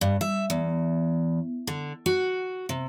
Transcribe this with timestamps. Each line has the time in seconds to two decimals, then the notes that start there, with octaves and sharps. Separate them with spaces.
0.01 G2
0.21 E5
0.50 E2
1.67 D3
2.06 F#4
2.69 C3